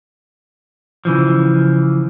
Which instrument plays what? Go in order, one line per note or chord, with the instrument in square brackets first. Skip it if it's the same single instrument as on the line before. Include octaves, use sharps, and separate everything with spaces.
[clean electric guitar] C#3 E3 F3